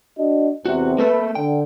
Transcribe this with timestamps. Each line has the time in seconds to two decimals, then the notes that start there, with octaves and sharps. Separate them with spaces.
0.18 D4 F#4 D#5
0.66 E2 C3 F#4
0.98 A#3 A4 B4 E5
1.35 D3 G5